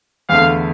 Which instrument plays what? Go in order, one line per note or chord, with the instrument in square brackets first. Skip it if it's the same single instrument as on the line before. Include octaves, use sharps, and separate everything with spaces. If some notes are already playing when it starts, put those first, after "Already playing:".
[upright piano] E2 D3 A3 [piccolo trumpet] F5